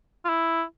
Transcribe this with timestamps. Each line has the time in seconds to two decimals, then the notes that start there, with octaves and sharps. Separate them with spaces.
0.25 F4
0.29 E4